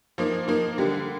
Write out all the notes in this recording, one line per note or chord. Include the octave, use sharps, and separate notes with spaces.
F3 A#3 D#4
F3 A#3 D#4
D3 G3 A#3